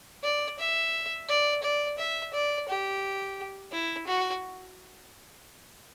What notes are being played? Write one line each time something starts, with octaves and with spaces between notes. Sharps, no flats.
D5
E5
D5
D5
E5
D5
G4
E4
F#4